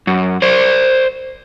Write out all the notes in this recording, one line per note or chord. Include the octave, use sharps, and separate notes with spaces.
F#2
C5 D5